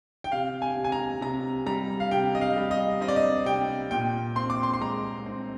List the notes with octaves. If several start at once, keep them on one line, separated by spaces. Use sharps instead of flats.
G5
C3 F5
G#5
C3
G#5
A#5
C3 A#5
G3 A#5
F5
C3 G5
D#5
F5
G3
D#5
C4 D#5
D5
D#5
C3 G5
A#2 G5
C4 C6
D6
C6
C6
G#3 A#5
C4